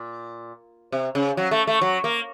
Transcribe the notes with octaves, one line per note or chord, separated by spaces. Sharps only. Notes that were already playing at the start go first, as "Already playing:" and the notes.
Already playing: A#2
C3
C#3
F#3
A3
A3
F#3
A#3